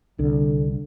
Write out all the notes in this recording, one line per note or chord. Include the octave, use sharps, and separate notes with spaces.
C2 D3